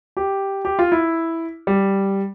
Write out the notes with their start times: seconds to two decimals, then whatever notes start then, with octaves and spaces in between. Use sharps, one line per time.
0.17 G4
0.65 G4
0.79 F4
0.92 E4
1.67 G3